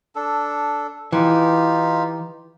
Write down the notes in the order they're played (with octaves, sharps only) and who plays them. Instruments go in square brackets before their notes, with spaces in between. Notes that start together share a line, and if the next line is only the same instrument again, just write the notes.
[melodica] D4 A4
[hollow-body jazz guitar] E3 [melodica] D#4 F4 G4